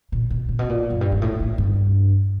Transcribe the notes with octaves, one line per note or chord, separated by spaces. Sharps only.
A#2
B2
A#2
B2
A#2
F#2
G2
G#2
A2
G#2
G2